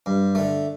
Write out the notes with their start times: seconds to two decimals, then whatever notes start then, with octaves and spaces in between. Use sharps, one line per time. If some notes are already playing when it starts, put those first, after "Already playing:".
0.06 G2
0.35 D3 A3